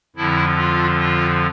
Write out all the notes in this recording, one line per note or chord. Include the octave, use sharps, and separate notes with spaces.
F2 D3 F3 E4
F4
F4